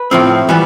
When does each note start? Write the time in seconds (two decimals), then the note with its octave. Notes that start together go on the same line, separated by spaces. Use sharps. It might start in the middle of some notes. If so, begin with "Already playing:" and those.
Already playing: B4
0.11 A2 F3 C4
0.49 E3 G3 B3